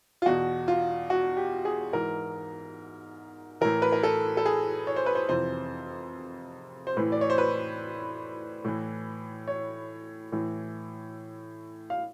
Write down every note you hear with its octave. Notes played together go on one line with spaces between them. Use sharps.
F4
E2 B2 F#4
F4
F#4
G4
G#4
G#2 E3 A#4
A2 E3 A#4
B4
A#4
A4
A4
G#4
C#5
C5
B4
C5
F2 C3 E3 C5
C5
A2 E3 B4
D5
C#5
C5
B4
A2 E3
C#5
A2 E3
F5